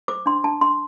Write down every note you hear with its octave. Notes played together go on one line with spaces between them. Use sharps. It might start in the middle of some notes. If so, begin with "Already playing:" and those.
C5 D6
D4 C6
D4 A5
D4 C6